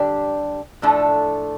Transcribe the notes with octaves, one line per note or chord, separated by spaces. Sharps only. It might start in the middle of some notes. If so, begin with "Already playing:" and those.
Already playing: D3 G3 D4 G4
A2 F3 A3 D4 A4